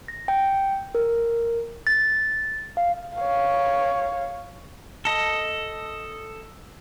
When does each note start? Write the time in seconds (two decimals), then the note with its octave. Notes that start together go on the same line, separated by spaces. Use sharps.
0.08 A#6
0.28 G5
0.95 A#4
1.87 A6
2.77 F5
3.16 C#5 F5
5.05 A4 D#5